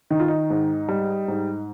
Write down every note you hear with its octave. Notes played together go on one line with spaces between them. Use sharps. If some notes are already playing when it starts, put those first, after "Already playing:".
D#3 D#4
F4
D#4
G#2
G3
G#2